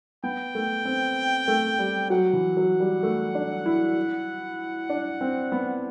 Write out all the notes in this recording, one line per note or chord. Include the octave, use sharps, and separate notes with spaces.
B3 G5
A3
C4
A3
G3
F#3 F#5
E3
F#3
G3
A3
D4
E4
D4
C4
B3